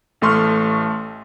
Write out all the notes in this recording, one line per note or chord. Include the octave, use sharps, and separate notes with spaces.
A1 A3 C6 C#6 F6